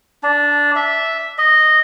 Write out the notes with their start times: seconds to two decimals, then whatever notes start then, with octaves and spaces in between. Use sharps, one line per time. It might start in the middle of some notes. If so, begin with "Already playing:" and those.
0.23 D4
0.76 E5
1.38 D#5